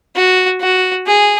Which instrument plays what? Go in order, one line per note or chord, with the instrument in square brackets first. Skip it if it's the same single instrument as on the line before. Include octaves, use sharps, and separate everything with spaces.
[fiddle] F#4
F#4
G#4